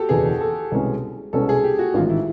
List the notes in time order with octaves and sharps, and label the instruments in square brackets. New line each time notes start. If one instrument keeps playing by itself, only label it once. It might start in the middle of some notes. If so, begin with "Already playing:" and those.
Already playing: [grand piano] F#4 G4 A4
[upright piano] F#1 E2 B2 [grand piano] G#4
[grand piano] A4
[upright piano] C2 B2 G#3 C#4
[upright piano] C2 B2 G#3 C#4 [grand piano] A4
[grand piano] G#4
G4
F#4
[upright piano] A1 G#2 D#3 [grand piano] F4
[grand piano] E4